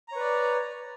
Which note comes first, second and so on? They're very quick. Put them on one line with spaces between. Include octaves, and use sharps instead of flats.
A#5 C#5 B4 D5